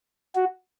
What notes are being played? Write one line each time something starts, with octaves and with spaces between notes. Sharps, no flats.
F#4